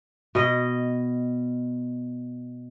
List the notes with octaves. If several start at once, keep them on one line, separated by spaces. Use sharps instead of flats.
B2 D#5